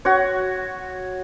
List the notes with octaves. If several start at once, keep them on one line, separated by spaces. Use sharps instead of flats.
F#4 C#5